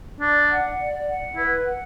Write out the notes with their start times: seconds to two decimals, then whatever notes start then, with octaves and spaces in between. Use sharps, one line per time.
0.20 D4 D5
0.50 F#5
0.79 D5
1.07 F#5
1.36 E4 B4
1.65 F#5